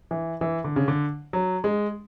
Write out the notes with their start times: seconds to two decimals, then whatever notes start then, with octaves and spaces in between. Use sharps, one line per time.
0.11 E3
0.41 E3
0.64 D3
0.76 C#3
0.88 D3
1.33 F#3
1.64 G#3